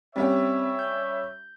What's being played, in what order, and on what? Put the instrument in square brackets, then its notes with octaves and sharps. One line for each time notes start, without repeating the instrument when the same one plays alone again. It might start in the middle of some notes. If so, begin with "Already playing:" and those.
[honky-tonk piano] G3 C#4 G4 [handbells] C4 [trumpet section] C#5 E5
[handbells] G6